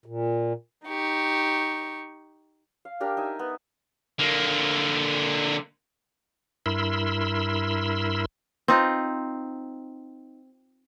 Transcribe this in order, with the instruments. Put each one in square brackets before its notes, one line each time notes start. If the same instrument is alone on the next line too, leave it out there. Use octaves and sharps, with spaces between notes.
[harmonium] A#2
[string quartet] D#4 G4 C#6
[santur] F5
D4 G4 A#4
D#4 E5 G#5
B3
[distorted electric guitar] D3 A#3
[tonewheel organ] G2 E4 A#4 B5 C6 E6
[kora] C4 D#4 F4